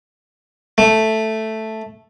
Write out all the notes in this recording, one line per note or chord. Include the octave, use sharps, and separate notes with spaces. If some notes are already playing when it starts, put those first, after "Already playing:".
A3